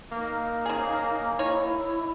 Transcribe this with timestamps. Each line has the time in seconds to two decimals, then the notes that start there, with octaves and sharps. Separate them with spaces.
0.12 A#3 D#4
0.66 C#3 G#4
1.39 D#4 E4 C#5